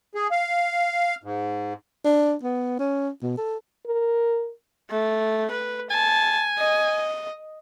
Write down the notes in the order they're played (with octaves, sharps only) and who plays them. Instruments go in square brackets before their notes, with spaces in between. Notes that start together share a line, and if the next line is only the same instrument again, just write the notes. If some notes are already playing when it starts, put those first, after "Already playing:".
[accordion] G#4
F5
G#2
[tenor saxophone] D4
B3
C#4
B2
A4
[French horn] A#4
[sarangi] A3
B4
[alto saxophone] G#5 [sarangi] A5
[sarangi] D#5